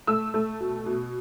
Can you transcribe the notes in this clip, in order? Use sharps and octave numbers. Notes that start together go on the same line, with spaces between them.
A3 E6
A3
B2
B2